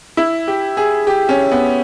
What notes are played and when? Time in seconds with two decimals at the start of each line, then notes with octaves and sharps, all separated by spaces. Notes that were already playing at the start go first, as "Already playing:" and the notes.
0.17 E4
0.48 G4
0.77 G#4
1.07 G4
1.29 C#4
1.52 B3